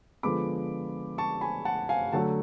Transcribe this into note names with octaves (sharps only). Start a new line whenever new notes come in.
D3 F3 G#3 B3 B5 D6
A5 C#6
G#5 B5
F#5 A5
F5 G#5
D3 F#3 A3 F#5 A5